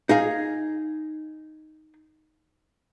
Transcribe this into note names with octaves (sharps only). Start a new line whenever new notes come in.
D#4 G#4 F5